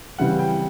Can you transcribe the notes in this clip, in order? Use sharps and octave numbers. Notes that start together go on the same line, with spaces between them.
C#3 E3 G3 C4 E4 F#5
G5